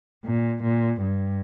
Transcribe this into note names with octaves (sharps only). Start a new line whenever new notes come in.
A#2
A#2
G2